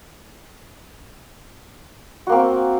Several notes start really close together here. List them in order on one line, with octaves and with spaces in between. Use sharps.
F#4 A#3 C4